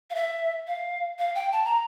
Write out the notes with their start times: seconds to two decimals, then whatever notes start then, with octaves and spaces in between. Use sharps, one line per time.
0.10 F5
0.15 E5
0.67 F5
1.19 F5
1.35 G5
1.52 A5
1.65 A#5